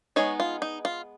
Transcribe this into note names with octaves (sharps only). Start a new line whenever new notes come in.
G#3 B3 D#4 C#5
F4
D#4
F4